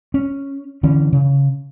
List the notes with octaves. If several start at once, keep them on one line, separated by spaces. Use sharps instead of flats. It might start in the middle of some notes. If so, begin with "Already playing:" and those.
C#4
D3 E3 C#4
C#3